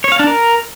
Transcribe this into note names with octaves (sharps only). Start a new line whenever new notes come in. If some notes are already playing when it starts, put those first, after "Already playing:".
C#5
F5
D4
A#4